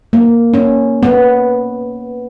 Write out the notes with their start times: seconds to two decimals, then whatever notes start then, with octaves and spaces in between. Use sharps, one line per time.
0.13 A#3
0.54 C#4
1.03 B3